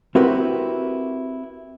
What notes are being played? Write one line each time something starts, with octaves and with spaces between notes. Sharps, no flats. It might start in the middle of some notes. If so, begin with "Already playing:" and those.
C4 E4 F#4 G4 A#4 B4